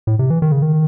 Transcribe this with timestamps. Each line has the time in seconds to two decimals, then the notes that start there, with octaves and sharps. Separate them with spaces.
0.07 A2
0.19 C3
0.30 E3
0.42 D#3
0.52 C#3
0.62 D#3